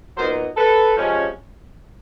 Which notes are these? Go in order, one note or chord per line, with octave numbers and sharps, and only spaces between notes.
A#2 F#3 B3 D#4 A#4 C5
A4 B4
C3 F3 G#3 C#4